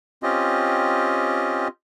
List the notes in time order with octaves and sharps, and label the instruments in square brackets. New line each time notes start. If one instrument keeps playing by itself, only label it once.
[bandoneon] C4 C#4 F4 G4 D#5